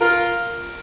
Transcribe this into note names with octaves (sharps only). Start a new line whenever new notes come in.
F4 A#4